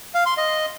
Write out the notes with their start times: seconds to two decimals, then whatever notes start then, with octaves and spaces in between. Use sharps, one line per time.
0.14 F5
0.26 C6
0.37 D#5